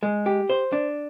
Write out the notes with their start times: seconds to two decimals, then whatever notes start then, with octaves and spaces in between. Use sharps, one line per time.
0.03 G#3
0.26 G4
0.50 C5
0.72 D4